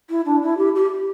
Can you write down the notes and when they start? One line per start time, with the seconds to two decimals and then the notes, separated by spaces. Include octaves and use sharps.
0.10 E4
0.26 D4
0.43 E4
0.58 G4
0.75 G4